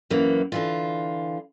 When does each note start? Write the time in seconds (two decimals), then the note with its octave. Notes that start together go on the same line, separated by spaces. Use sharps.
0.10 F#2 E3 A#3
0.52 D3 E3 F4